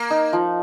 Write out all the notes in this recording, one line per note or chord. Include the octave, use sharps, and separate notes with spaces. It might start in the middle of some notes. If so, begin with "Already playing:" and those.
Already playing: A#3
D#4
F3